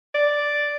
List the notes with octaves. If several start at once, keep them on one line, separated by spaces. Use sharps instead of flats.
D5